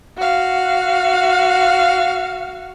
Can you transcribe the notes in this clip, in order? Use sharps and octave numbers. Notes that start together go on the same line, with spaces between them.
F#4 F5